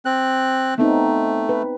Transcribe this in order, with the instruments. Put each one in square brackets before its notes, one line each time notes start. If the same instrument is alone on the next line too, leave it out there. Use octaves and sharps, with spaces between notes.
[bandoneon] C4 F#6
[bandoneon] A3 [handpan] B3 C4 D#4
[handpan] B4